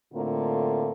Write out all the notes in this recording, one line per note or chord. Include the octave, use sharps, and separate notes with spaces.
A2 D3 A3 A#3 C4 F4